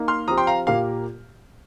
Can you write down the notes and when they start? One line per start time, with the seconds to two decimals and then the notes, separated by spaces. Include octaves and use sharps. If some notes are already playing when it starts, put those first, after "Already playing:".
Already playing: A#3 D#4 A#4
0.08 C6 F6
0.28 F3 C4 G4 A#5 D#6
0.38 G5 C6
0.47 F5 A#5
0.67 A#2 A#3 G4 A#4 F5